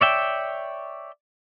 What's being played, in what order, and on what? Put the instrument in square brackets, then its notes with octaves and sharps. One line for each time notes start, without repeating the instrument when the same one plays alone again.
[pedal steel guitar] C#5 D5 E5 G5